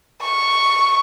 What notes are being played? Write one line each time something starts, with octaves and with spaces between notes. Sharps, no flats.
C#6